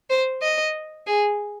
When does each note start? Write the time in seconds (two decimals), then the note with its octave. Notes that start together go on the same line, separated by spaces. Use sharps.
0.10 C5
0.42 D#5
1.07 G#4